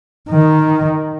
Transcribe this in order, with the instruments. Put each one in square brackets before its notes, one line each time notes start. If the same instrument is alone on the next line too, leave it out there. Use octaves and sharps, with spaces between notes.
[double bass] D#3